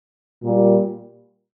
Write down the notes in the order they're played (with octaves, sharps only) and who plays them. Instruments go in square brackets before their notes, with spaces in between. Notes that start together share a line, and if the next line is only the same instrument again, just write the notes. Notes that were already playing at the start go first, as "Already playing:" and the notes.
[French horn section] A#2 G3